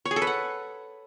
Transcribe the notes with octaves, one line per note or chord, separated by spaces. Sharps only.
C#5
G#4
A4
B4
F#5